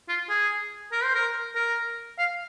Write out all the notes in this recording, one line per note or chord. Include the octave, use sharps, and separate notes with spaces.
F4
G#4
A#4
C5
A#4
A#4
F5